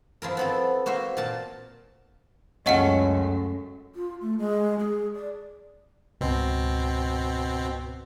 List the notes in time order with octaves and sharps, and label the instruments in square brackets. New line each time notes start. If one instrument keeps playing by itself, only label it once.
[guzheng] F3 E4 A#4
B3 C4 A4
A#3 F#4 C5 E5
A#2 A#4 A5
[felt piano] C#2 [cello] F#2 [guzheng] A3 C#4 F#4 [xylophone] D#5 F#5 C#7
[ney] F4
A3
G#3
G#4
D5
[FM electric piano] C#2 G#2 [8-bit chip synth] B2 C4